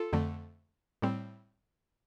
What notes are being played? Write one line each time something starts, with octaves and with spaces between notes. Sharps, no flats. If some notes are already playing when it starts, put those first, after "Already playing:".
Already playing: F4 A4
F2 D3 A3
A2 G3 C4